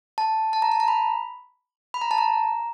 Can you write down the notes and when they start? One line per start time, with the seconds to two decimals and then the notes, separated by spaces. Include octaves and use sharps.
0.18 A5
0.53 A5
0.62 A#5
0.72 A5
0.80 A#5
0.88 B5
1.94 B5
2.01 A#5
2.11 A5
2.18 A#5